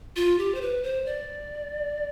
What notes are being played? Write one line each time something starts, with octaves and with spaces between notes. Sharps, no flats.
F4
G4
C5
B4
C5
D5